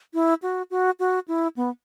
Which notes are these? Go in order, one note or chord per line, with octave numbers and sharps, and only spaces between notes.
E4
F#4
F#4
F#4
E4
B3